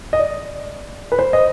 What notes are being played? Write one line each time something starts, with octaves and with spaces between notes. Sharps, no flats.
D#5
D5
B4
C5
D#5